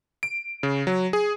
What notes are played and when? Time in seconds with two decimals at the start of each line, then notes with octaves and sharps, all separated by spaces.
0.23 D7
0.63 C#3
0.87 F#3
1.13 G#4